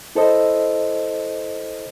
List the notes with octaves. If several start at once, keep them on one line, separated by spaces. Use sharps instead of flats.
E4 A4 C5 D#5